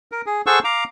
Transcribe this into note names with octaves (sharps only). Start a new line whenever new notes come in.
A#4
G#4
G#4 A4 C5 F#5 C#6 E6
F5 A#5 D6